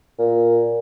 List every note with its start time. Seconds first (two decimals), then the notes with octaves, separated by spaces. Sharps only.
0.19 A#2